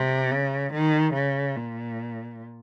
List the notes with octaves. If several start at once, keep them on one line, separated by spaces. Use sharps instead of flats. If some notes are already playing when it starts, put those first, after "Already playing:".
Already playing: C3
C#3
D#3
C#3
A#2